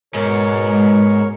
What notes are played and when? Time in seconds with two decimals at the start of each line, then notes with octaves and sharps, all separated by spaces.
0.14 G#2 B2 G#3 A#4 C#5